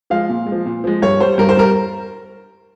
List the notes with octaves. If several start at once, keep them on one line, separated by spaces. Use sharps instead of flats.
F3 G#3 F5
A#2
G#3
F3
A#2
F3 G#3
G2 C#5
G3 C5
G2 A#4
C5
G3 A#4